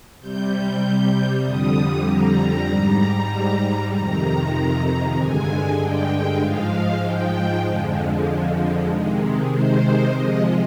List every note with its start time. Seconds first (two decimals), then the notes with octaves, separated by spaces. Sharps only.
0.20 C3 G3 G6
1.44 F2 D3 G3 D#6
2.06 A#5
2.69 G#2 G3
3.92 F2 C3 D#3 A#5
5.16 G2 D3 G#3 G#5
5.78 G5
6.41 G#2 F3 G#3 F5
7.02 G5
7.66 F2 D3 F3 G#3
8.89 C3 D#3 G#3
9.52 C5
10.13 C3 F3 G#3 D#5